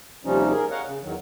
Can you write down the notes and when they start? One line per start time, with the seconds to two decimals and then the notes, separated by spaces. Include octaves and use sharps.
0.25 D#2 C3 F3 G3 C#4 D#4
0.52 G#4 A#4
0.71 A#4 C#5 D#5 F5 F#5
0.86 C#3
1.03 E2 D#3 F#3